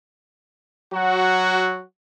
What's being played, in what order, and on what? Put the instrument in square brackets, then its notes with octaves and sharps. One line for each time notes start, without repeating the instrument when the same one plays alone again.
[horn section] F#3 F#4